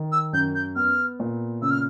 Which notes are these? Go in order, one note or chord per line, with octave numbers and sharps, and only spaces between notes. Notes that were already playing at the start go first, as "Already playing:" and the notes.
Already playing: D#3
E6
F#2 G6
G6
B3 F6
A#2
C#3 E6
F6